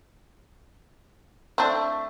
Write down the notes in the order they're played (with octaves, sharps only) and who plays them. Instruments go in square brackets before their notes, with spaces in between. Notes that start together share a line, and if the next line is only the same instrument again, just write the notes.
[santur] A3 A4 D6 [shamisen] C4 D4